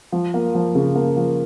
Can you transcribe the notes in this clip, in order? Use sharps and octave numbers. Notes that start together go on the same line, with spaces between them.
F3
A#3
F3
C#3
A#3
F3